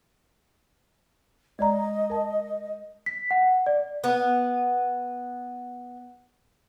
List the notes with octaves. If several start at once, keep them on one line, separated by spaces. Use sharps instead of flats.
G#3 D5 D#5 A#5
A#4 A5
B6
F#5
D5
B3 B4